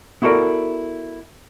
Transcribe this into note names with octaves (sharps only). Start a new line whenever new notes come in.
B3 E4 F#4 A4 A#4 D5